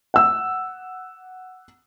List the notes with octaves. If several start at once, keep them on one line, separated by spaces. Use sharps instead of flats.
F#5 E6